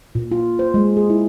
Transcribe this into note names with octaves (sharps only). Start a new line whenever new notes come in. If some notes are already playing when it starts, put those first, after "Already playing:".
A#2
F4
C5
G#3
G#4
E4